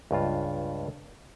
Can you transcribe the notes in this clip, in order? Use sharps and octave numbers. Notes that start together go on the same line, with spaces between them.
C#2 G2 F4